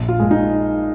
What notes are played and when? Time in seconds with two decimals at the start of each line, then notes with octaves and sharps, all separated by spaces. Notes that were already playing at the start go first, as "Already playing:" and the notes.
Already playing: A#1
0.09 F4
0.20 A#2 G#3
0.31 D#4